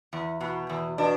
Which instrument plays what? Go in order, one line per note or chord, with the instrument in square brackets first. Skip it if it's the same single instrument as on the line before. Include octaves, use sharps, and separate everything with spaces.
[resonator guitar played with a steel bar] E2
B2
E2
[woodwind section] B2 [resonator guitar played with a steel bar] D4